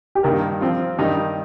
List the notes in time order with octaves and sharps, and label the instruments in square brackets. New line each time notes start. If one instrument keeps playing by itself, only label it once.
[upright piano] G4
[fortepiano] G2 D#3 A#3 [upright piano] A#4
[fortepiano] F3 C4 F4
G2 D#3 G3 D#4